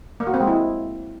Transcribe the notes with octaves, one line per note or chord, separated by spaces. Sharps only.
A#3
F#4
C4
G#3
E4